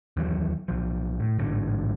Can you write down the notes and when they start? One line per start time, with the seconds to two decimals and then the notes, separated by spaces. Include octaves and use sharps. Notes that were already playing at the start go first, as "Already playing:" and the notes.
0.17 D#2 E3 F#3
0.68 B1 F3
1.20 A2
1.39 A1 G#2 D3